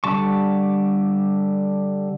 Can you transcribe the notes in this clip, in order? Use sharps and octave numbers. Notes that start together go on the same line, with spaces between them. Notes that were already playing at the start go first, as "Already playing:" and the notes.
D3 G3 A5 C#6